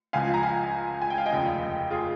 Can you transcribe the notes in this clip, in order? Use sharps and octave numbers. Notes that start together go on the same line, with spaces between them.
C#2 C#3 F3 F5 G#5
A#5
F5 G#5
G#5
G5
F5
D#5 G5
F1 D#2 C#3 F3
F4 G#4